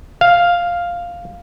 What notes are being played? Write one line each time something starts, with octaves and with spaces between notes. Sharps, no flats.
F5